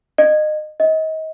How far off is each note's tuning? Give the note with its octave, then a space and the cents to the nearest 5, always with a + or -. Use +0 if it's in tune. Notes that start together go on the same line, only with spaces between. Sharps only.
D#5 -30
D#5 +30